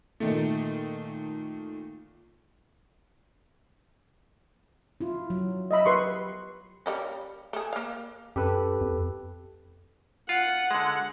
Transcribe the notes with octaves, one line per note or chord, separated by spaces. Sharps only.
A#2 D#3 A3
E4 F4
F#3
D#5 E5 B5
G4 B4 C6 C#6
G3 A#3 C#4
A3 G#4
A#3 F5
F#2 G4 A4 B4
F2
F4 F#5
D3 G#3